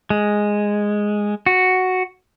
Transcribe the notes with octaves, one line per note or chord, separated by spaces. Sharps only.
G#3
F#4